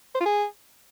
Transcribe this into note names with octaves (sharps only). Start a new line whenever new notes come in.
C5
F4
G#4